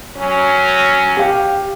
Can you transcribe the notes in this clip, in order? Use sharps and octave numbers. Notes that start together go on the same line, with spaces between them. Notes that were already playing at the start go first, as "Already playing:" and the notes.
F#3 C#4
G4 F5